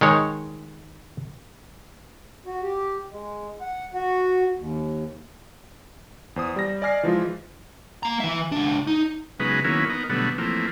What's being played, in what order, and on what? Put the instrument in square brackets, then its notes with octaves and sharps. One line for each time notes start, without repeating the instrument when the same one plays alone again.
[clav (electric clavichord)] D#3 G#3 C#5
[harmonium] F#4
G4
G#3
F#5
F#4
D#2
[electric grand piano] E2 C5 D#6
G3 A#6
D5 D#5 G#5 F6 A#6 C7
E3 F3 G#3 F4
[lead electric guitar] A#3 A#5
E3 E5
C#2 D4
D#4
[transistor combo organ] C#3 F#3 G#3 B3 D#4 B4
D#3 F#3 A#3 B3 C#4 E4
B3 D#4 A#4
B2 D3 F#3 G3 A3 B3
E3 F3 A3 A#3 C4